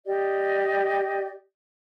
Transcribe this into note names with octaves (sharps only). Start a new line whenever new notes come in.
G4 D5 D#5